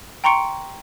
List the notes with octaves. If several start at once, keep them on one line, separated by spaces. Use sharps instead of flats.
G5 A#5 C6 C#6 C#7 D7